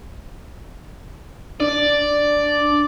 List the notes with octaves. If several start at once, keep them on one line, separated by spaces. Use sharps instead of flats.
D4 D5